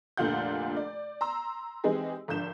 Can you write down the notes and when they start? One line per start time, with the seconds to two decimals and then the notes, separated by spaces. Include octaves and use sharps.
0.17 F1 A#2 D3 F4 F#5 G6
0.77 D5
1.21 A#5 C6 E6
1.84 E3 G#3 C4 D#4 G4 G#4
2.28 G#1 D3 F3 G6 E7